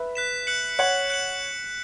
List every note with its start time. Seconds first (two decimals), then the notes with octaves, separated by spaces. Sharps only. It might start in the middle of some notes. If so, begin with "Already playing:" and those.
Already playing: B4 E5
0.15 F#6 B6 E7
0.47 F#6 C#7 F#7
0.79 C#5 F#5 F#6 C#7 F#7
1.10 F#6 C#7 F#7